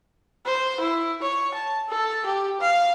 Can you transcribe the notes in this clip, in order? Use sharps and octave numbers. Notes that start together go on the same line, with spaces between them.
C5
E4
C#5
A5
A4
G4
F5